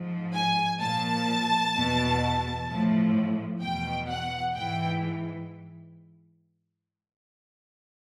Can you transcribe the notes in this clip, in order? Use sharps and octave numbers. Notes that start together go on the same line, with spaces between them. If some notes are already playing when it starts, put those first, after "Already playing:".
Already playing: G#2 F3
G#5
A#2 F3 A5
E2 B2
A2 F3
E2 B2 G5
F#5
G#2 E3 G5